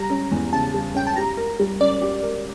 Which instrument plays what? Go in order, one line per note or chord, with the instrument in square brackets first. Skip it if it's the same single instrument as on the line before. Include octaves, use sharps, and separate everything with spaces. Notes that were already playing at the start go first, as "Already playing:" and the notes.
Already playing: [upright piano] G3 [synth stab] A#5
[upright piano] C#4
E2
[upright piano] C#3 [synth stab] A5
[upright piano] G3
[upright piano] C#4 [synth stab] G5
[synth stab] A5
[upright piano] G4 [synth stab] A#5
[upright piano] A#4
G3
[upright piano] C#4 [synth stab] D5
[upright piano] G4
A#4